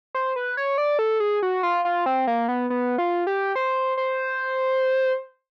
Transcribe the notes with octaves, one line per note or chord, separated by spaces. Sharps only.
C5
B4
C#5
D5
A4
G#4
F#4
F4
F4
C4
A#3
B3
B3
F4
G4
C5
C5